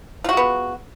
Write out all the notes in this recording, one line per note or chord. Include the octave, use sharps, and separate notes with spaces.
G#3 B3 F4 F#4